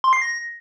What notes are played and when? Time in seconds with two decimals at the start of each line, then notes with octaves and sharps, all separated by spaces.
0.04 C6
0.13 C7
0.22 A#6